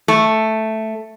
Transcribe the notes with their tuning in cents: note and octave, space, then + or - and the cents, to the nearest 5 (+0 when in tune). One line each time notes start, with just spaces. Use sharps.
A3 +0